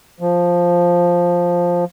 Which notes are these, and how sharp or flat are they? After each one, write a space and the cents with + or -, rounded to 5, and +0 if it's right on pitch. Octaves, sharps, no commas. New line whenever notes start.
F3 +5